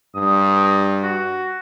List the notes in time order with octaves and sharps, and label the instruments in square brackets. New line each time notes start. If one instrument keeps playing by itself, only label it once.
[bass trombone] G2 [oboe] D#6
[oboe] F#4